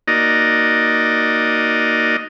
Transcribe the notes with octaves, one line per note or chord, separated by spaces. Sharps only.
A#3 D#4 F#4 D5 D#5